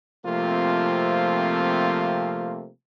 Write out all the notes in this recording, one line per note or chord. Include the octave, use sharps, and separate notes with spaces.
C3 F3 A3 A#3 C4 F4